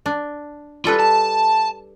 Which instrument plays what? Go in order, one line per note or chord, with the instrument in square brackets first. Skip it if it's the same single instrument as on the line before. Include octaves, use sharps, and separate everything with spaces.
[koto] D4
[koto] G3 A4 B4 [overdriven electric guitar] F4
[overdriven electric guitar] A5